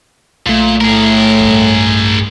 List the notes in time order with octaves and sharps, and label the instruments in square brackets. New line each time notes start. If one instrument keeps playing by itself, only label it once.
[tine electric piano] B1 A3 [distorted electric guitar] A#2
[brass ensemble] A2 [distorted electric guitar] G#4 A#4
[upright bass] A1 G2